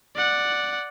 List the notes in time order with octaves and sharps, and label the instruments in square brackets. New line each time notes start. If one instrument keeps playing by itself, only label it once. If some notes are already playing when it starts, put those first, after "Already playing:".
[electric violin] D5 F#5